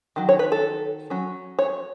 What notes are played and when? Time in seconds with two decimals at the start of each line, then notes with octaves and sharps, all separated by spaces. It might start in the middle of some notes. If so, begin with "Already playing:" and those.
0.16 D#3 F#3
0.29 C#5
0.39 B4
0.52 A4
1.10 F#3 C#4
1.59 C#5